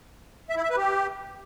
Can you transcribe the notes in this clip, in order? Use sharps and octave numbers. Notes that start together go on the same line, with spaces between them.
E5
E4
E5
B4
G4